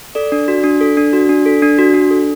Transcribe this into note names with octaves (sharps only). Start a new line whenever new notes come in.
A4 D5
D4
F#4
D4
A4
D4
F#4
D4
A4
D4
F#4
D4
A4